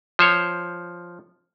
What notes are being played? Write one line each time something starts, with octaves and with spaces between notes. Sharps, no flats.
F3 C5 C#5